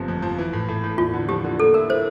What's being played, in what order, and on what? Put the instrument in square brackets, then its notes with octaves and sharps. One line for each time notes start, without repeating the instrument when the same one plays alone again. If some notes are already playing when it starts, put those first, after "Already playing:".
Already playing: [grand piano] G1 C3 F3
F2
F3
E3
A2
A2
A2
[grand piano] E2 [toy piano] F4
[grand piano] D3
[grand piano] F3 [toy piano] G4
[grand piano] D3
[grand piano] A#3 [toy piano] A4
[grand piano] E4 [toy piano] A#4
[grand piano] E4 [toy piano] C5